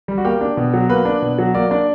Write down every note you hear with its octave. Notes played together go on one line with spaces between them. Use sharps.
G3
F#4
A#3 G4
D4
B2
F#3
A#3 B4
D4
B2
F#3
A#3 D5
D4 D5